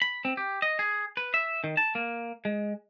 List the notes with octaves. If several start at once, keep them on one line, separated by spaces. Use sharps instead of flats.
B5
C4
G4
D#5
G#4
B4
E5
D#3
A5
A#3
G#3